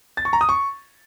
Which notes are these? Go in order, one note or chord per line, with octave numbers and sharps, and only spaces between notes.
A6
C#6
A#5
D#6
C#6